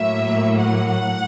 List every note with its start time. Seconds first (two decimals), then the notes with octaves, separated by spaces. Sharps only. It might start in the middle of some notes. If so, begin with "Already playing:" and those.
Already playing: A2 F#3 A#3 E5
0.60 F#5